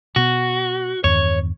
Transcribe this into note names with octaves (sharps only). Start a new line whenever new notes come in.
B2 B3 F#4
E2 G2 D#3 C#5